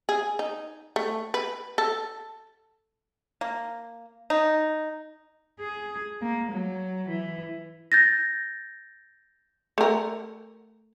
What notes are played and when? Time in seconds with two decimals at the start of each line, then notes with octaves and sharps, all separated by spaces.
0.09 G#4
0.39 D#4
0.96 A3
1.34 B4
1.78 A4
3.41 A#3
4.30 D#4
5.60 G#4
6.22 A#3
6.52 F#3
7.09 E3
7.92 G6 A6 A#6
9.78 A3 A#4